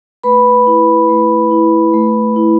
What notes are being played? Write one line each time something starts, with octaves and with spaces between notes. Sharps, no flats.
A3 B4 B5
E4
A3
E4
A3
E4